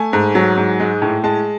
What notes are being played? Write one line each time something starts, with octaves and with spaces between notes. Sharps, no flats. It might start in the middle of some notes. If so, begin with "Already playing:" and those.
Already playing: A3 G#5
G#2
F#3
G#2
G#3
A2
G#3 A5